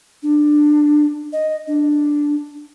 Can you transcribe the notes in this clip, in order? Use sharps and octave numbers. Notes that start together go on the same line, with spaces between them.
D4
D#5
D4